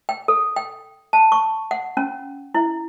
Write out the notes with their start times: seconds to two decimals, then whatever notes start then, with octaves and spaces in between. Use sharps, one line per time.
0.09 G5
0.28 A4
0.56 G5
1.13 A5
1.32 C#6
1.71 F#5
1.97 C#4
2.55 E4